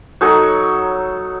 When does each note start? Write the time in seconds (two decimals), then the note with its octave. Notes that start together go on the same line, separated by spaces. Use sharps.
0.21 F#3 D#4 A4 C#5